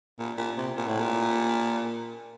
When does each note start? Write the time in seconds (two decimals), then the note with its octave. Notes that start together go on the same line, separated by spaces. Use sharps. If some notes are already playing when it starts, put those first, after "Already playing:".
0.19 A#2
0.38 A#2
0.57 C3
0.77 A#2
0.88 A2
1.00 A#2